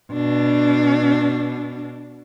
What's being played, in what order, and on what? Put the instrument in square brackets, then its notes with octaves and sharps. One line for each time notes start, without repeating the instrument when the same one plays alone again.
[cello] B2 D4